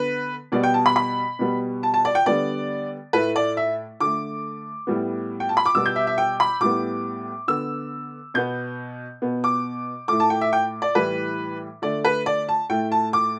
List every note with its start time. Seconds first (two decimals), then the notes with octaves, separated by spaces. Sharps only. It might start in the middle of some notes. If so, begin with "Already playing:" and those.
Already playing: D3 B3 B4
0.52 B2 G3 B3 D5
0.63 G5
0.74 A5
0.86 B5
0.96 B5
1.39 B2 G3 B3
1.83 A5
1.94 A5
2.05 D5
2.15 G5
2.26 D3 G3 B3 D5
3.13 A2 A3 B4
3.36 D5
3.57 E5
4.00 D3 A3 D6
4.87 A2 G3 B3
5.40 G5
5.49 A5
5.57 B5
5.66 D6
5.75 B2 G3 B3 E6
5.86 G6
5.96 E5
6.07 E5
6.18 G5
6.40 B5
6.60 A2 G3 B3 D6
7.48 D3 B3 E6
8.34 B2 B3 G6
9.22 B2 B3
9.44 D6
10.08 A2 A3 D6
10.20 A5
10.30 G5
10.41 E5
10.53 G5
10.82 D5
10.95 A2 E3 G3 B4
11.82 D3 A3 D5
12.05 B4
12.26 D5
12.49 A5
12.70 A2 A3 G5
12.92 A5
13.13 D6